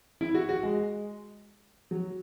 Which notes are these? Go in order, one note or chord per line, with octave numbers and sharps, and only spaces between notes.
E4
F#4
F#4
G#3
F#3